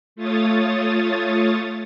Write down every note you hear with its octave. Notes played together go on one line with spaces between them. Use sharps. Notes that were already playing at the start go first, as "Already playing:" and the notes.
A3 F4 C#5 D#6 A6